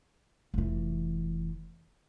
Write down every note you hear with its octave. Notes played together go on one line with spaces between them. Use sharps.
F1 E3